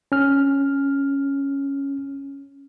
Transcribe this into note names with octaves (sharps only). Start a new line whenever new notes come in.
C#4 F6